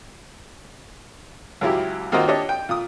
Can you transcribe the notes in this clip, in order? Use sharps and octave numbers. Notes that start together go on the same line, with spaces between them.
C#2 F#3 E4 G4
D#3 A#3 C4 F4 F#4 D#5
D4 G4 C#5 D#5
G5
A#2 D#6